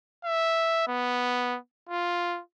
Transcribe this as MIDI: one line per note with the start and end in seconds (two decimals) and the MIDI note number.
0.25 0.85 76
0.87 1.57 59
1.89 2.40 65